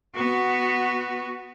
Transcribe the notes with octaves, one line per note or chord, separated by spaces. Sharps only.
B3 F#4